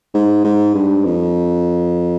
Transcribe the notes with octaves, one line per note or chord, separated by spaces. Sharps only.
G#2
G#2
G2
F2